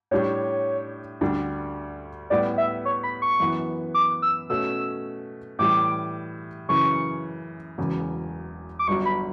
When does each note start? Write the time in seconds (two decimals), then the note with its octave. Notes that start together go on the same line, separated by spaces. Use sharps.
0.11 A2 G3 D4 G4 C#5
1.21 D2 D3 G3 D4
2.30 A2 G3 B3 D5
2.58 E5
2.85 C#5
3.04 B5
3.22 C#6
3.40 F#2 E3 B3
3.94 D6
4.22 E6
4.50 B2 A3 C#4 E6
5.59 A2 E3 G3 D6
6.69 F#2 C#3 E3 C#6
7.78 E1 E2 C#3 F#3
8.79 D6
8.88 G1 G2 F#3 C#6
9.06 B5